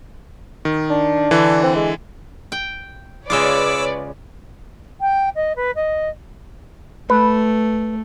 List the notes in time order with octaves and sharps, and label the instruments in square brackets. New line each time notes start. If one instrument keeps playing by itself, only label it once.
[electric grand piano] D#3
[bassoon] D4
[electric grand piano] D3 E3
[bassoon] C4
G#3
[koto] G5
[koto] C#3 G#3 F4 [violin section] B4 C#5 D5 [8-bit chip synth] D6 E6
[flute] G5
D#5
B4
D#5
[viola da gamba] A3 [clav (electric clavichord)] B4